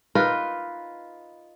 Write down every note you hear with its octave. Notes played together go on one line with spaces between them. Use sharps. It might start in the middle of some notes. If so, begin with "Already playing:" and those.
D#4 F4 A#4 B4